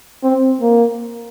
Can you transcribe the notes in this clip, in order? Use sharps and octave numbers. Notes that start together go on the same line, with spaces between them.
C4
A#3